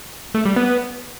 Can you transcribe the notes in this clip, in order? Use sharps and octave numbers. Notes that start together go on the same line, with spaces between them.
A3
G3
B3